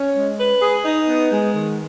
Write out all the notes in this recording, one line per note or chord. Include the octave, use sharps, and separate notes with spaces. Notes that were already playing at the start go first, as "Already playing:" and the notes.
Already playing: C#4
G#3
B4
G#4
D#4
B3
G#3
D#3